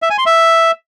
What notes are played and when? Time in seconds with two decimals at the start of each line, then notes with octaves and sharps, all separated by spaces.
0.02 E5
0.10 G#5
0.18 C6
0.26 E5